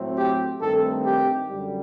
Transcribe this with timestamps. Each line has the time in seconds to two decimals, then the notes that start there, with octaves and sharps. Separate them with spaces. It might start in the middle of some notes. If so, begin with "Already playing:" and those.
Already playing: A2 F#3 A3 C4
0.17 G4
0.60 G2 D#3 A3 C4 A4
1.04 G4
1.48 F#2 D3 G3